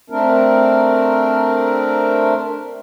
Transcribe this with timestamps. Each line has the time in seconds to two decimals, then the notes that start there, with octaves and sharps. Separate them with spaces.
0.10 A3 C4 D4 A#4